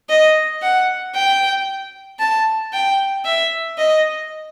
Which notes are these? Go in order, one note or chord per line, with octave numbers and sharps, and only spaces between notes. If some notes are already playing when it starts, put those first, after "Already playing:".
D#5
F#5
G5
A5
G5
E5
D#5